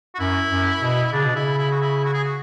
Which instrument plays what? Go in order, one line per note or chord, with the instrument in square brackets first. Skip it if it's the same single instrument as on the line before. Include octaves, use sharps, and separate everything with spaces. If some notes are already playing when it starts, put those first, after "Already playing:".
[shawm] F#4
[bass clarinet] F#2 [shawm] E4
[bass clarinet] F#2
B2
[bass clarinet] C#3 [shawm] D4
[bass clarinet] B2
[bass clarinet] C#3 [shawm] E4
[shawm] E4
F#4
E4
F#4
G#4
F#4